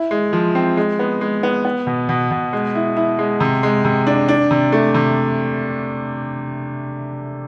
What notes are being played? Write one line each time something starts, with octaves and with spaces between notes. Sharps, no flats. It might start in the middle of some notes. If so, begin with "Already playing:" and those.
Already playing: E4
G#3
F3
C4
G#3
B3
G#3
B3
B3
B2
B2
B2
G#3
E4
E4
G#3
C3
G#3
C3
D4
D4
C3
A3
C3